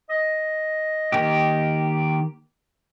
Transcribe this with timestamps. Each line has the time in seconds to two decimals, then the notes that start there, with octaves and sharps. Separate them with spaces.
0.10 D#5
1.12 D#3 A#3 G4